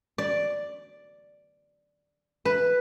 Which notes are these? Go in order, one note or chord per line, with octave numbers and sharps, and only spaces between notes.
D5
B4